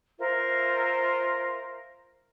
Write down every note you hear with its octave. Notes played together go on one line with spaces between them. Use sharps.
F4 A#4 C5 E5